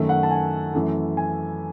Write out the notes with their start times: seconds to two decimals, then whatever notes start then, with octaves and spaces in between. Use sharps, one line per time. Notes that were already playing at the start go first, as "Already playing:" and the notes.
Already playing: F#2 D#3 A3
0.09 F#5
0.23 A5
0.31 G#5
0.74 F#2 E3 A3
1.17 G#5